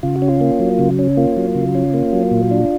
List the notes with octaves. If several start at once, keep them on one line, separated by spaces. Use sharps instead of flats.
C#3 F4
F#4
C#4
F4
A#3
F#3
C#3
C#4
A#3 F4
F#3
C#3
C#4
A#3
F#3
A#2
D4